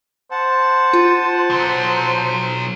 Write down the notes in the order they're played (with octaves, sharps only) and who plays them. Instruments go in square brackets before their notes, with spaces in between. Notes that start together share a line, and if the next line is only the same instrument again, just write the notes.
[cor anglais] C5 [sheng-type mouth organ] F#5 A5
[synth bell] F4
[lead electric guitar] B2 F#3